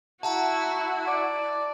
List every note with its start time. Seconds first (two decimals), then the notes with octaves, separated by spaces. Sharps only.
0.23 E4 F#4 E5 F#5 A5 A#5
1.08 D5